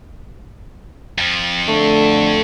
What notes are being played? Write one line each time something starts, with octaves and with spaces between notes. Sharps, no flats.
F2 F3
D3 A3